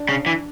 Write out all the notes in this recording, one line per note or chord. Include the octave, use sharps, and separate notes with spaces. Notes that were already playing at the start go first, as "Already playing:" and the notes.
Already playing: D4
C#3
E3